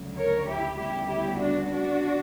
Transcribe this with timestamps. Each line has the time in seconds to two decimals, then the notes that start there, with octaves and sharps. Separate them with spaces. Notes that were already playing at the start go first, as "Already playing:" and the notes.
Already playing: D2 C#3 F#3
0.17 A#4 C#5
0.48 E4 G4
0.78 D2 C#3 G3 B3 E4 G4
1.08 E4 G4
1.39 D4 F#4
1.69 D4 F#4